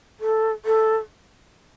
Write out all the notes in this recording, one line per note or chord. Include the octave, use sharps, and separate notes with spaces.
A4
A4